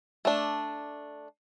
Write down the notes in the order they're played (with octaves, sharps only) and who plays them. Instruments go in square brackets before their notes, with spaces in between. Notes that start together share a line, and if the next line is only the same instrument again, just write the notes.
[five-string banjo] A3 D4